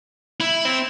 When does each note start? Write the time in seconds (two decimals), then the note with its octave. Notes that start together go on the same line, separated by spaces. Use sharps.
0.40 E4
0.65 C4